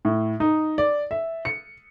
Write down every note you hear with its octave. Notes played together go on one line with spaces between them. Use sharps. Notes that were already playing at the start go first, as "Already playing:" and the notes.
A2
D#4
D5
E5
C#7